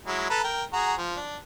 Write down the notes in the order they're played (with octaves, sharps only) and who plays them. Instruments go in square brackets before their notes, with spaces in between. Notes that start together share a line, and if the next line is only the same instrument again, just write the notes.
[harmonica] F#3 G#3 E4
A4 B4 A#5
A#4 G5
F#4 G#4 A#5
F3
D4